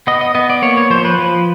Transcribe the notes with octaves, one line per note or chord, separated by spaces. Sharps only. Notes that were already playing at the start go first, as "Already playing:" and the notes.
B3 D#5
D#5
B3 D#5
D5
A#3 C#5
C#5
F3 C5
B4
F3